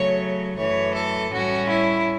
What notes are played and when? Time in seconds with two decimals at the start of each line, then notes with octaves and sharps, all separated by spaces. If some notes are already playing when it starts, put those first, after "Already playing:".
Already playing: C#3 F#3 A3 C#5
0.58 F#2 E3 A3 C#5
0.94 A4
1.32 A2 G3 C#4 F#4
1.69 E4